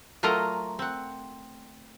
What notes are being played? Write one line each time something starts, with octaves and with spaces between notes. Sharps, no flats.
F#3 A3 F4 A#4 D#5 A#5
C4 F#5